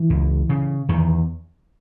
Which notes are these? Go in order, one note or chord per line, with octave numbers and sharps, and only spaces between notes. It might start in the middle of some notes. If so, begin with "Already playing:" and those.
Already playing: E3
C#2
C#3
E2 D#3